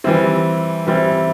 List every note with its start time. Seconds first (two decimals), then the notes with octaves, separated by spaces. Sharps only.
0.04 E3 G3 C4 E4
0.87 E3 G3 C4 E4